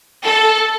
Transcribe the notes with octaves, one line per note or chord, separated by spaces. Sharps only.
A4